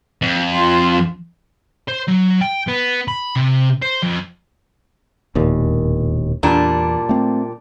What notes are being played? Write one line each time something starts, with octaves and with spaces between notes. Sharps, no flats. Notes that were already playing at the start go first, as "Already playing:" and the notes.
F2
F4 C6
C5
F#3
G5
B3
B5
C3
C5
F2
E1 D#2 A#2
E2 A#2 G3 D4
A3 C4